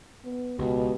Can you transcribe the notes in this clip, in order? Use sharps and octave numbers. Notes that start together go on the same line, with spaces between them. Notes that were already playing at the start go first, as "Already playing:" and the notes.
B3
C#2 B2 G4